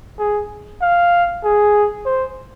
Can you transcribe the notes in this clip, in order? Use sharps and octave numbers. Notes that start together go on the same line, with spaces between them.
G#4
F5
G#4
C5